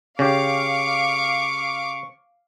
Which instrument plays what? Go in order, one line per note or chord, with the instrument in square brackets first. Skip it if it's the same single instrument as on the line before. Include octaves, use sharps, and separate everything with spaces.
[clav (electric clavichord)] C#3 C#4 G4 [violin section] F5 D6 [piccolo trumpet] C#6